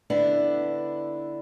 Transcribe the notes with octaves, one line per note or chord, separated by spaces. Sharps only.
D3 B3 D4 E4